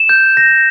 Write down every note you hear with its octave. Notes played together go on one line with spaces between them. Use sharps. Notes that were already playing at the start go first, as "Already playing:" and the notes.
Already playing: E7
G6
A#6